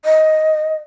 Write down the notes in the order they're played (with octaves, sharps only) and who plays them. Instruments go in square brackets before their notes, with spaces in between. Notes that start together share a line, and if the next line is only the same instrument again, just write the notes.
[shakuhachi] D#5